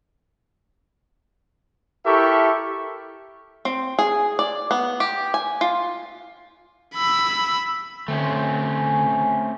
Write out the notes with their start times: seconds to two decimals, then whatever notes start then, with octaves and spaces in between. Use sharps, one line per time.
2.05 E4 G4 A4 A#4 E5 C#6
3.65 C4
3.99 G#4
4.39 D5
4.71 B3
5.00 G4
5.34 G#5
5.61 F4
6.95 B5 E6
8.08 D3 A3 C4 C#4